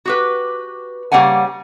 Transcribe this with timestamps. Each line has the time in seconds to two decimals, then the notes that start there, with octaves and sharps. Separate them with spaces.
0.05 F#4 G4 B4
1.12 C#3 G3 A#3 C#4 F#5 G#5